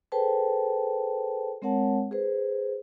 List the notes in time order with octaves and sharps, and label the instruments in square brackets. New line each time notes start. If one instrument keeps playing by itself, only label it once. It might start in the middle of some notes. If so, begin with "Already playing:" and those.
[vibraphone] G#4 A4 B4 C5 G5 A5
G#3 C4 A#4 C#5 F#5 A5
G#4 B4 C5